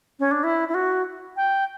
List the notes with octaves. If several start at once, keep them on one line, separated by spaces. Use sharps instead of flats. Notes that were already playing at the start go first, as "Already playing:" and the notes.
C#4
D4
E4
E4
F#4
G5